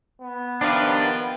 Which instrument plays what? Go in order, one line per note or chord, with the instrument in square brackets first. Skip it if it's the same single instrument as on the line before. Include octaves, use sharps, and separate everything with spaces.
[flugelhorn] B3
[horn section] C3 D#3 F3 [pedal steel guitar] D4 B4 [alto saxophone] G5